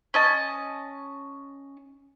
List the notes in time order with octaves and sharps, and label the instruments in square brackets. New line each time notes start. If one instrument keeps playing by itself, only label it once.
[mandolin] C#4 D#5 A5